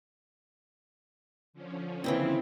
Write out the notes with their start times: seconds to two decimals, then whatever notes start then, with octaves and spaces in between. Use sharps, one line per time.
1.53 D3 F3 C#4
2.04 D#2 C#3 E3 C4 E4